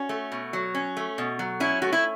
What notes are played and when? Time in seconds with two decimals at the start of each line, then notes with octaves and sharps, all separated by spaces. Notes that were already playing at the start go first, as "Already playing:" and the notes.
Already playing: C#4 F#4
0.09 A3
0.32 B2
0.53 F#3
0.75 C#4
0.97 A3
1.18 B2
1.39 F#3
1.60 C#4 E4
1.82 A3 F#4
1.92 E4